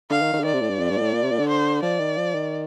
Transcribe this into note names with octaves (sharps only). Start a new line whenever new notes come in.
D3 F5
D#3
D#3
D3
D#3 D5
C3
A2
G2
F2
G2
A#2
A2
A#2
C3
A#2
D3
C5
F3 D5
D#3
F3
D#3